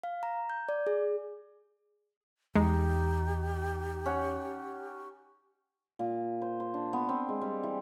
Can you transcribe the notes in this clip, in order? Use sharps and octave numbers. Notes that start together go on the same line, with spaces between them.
F5
A#5
G6
D5
G#4
E2 G#3 D#4 G4
C#4 F#5
A#2
C5
C5
D4
B3
C4
G#3
G3
E3